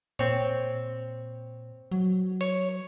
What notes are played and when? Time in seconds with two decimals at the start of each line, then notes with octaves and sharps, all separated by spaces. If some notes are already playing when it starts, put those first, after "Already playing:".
0.19 A#2 C4 C#5
1.92 F#3
2.41 C#5